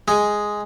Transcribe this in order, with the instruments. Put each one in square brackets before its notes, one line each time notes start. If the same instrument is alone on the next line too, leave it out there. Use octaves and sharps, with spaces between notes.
[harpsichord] G#3